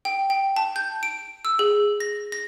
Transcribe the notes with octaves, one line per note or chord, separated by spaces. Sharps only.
G5
G5
A5
G6
D7
E6
G#4
A#6
A#6